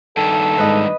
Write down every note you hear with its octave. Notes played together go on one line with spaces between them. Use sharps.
G2 D#3 A4
G#2 B4 D#5